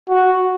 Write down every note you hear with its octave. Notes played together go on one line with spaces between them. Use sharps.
F#4